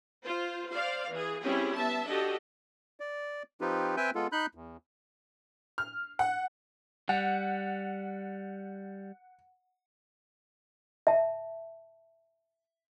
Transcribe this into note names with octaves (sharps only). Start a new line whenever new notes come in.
F4 C5
C5 D5 F5
E3 G#4
G3 C4 C#4 E4 G4 G#4
B3 E5 A5
D4 F#4 G4 A4 D#5
D5
F3 C4 D#4 F4 G4 B4
C4 B4 E5 G5 G#5 G6
G#3 B3 F4 A4
D#4 B5 F#6 G6
E2
F6
F#5
G3 F#5
E5 A5